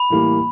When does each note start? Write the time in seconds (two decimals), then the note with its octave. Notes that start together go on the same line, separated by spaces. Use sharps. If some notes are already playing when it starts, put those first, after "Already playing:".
Already playing: B5
0.10 A2 E3 G3 A#3